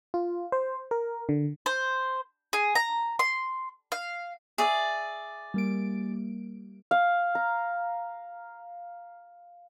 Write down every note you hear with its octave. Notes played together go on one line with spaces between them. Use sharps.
F4
C5
A#4
D3
C5
G#4
A#5
C6
F5
G#4 D5 E5
G3 A#3 D7
F5
A#5